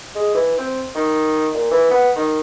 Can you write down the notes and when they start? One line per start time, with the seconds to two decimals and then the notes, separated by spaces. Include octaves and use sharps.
0.15 G#3
0.34 E3
0.58 C4
0.95 D#3
1.54 A#2
1.71 E3
1.91 B3
2.16 D#3